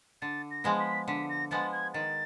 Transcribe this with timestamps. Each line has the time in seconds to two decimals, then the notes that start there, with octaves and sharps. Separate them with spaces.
0.21 D3 A6
0.50 A#6
0.64 F3 G#3 B3
0.79 B6
1.08 D3 B6
1.29 A#6
1.51 F3 G#3 B3 A6
1.72 G#6
1.93 D#3 A6